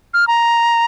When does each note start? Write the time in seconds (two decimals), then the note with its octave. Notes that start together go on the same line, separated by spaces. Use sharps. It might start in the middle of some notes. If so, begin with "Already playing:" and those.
0.14 F6
0.28 A#5